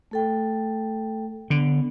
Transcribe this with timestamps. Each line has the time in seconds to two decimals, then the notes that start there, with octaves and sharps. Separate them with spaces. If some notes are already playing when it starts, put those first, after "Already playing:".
0.11 A3 A4 G5
1.50 D3 B3